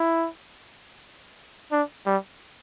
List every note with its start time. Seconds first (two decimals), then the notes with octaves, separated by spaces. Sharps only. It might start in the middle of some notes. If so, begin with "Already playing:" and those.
Already playing: E4
1.72 D4
2.06 G3